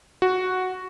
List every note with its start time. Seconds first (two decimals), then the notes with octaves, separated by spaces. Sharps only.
0.22 F#4